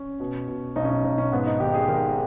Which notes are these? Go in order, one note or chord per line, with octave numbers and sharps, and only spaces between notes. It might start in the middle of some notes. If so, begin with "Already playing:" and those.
Already playing: C#4
B2
B2
B1 D#4
C#4
D#4
B1 D#4
C#4
G#2 B3
D#4
G#1 G4
G#4
G#1 A#4